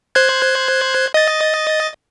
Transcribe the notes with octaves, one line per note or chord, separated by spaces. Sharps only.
C5 F#6 G#6
D#5 A6